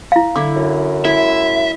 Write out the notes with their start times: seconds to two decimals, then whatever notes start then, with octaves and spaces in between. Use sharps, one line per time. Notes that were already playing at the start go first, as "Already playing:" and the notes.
0.12 E4 F5
0.36 D3 E4 D6
0.56 F#2
1.05 G#3 E4 E5